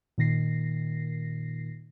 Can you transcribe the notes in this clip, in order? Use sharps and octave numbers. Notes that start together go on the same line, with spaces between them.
A#2 D#3 A#6 C7